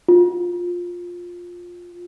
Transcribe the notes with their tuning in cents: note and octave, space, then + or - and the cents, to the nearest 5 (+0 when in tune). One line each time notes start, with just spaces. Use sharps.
F4 +10